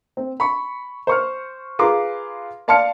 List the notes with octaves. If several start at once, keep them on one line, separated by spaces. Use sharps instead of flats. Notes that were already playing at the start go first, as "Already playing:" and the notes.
C4
B5 C#6
C5 C#6 F6
F4 G#4 B4 A#5 C6 D6
D5 F5 A5 C6 F6 C#7